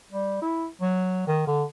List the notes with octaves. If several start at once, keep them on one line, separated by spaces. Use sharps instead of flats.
G3
E4
F#3
D#3
D3